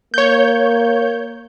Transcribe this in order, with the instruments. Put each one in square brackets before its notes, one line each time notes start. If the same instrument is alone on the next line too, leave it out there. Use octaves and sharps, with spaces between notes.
[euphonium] A#3 [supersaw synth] C#5 G6